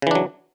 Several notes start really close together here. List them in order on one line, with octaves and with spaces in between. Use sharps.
C#3 E3 D4 F#3